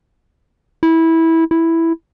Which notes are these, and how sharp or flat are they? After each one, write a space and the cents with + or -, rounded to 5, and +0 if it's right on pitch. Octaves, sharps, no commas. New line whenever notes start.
E4 -15
E4 +0